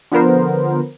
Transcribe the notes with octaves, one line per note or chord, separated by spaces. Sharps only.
D3 F3 B3 A#4 C5